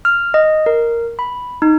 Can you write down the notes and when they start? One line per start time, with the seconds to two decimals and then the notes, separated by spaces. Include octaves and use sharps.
0.05 F6
0.34 D#5
0.66 A#4
1.19 B5
1.62 D#4